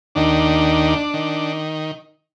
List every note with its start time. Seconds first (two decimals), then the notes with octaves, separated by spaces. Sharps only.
0.15 D#2 D#3 D4
1.14 D#3